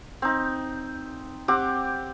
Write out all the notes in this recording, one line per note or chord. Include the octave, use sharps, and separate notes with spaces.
C4 D#4
C4 G4 F#5 D6